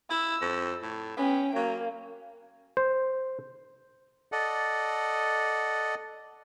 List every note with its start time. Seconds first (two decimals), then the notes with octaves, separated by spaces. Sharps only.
0.11 E4 E6
0.42 F2
0.82 A2
1.17 B3 C#4 G5
1.56 F#3 A#3
2.77 C5
4.32 A4 D5 D#5 F#5